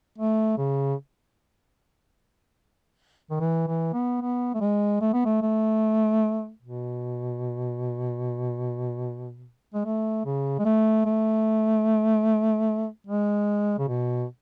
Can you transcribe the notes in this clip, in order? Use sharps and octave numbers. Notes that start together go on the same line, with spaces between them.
A3
C#3
D#3
E3
E3
B3
B3
A3
G#3
A3
B3
A3
A3
B2
G#3
A3
C#3
G#3
A3
A3
G#3
C#3
B2